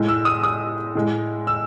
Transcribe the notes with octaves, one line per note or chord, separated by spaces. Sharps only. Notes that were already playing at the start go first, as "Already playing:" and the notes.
Already playing: A2 G#3
E6
D#6
D#6
A2 G#3
E6